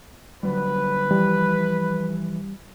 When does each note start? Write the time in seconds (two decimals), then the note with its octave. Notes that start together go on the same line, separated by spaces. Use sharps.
0.43 D3 F#3 G3 B4
1.11 E3 F3 G3